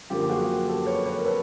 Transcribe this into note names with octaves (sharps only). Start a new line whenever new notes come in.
F#2 D3 F3 A#3 F4 G4
F#4 G#4
G4 A4
B4 C#5
B4 C#5
A#4
A4 B4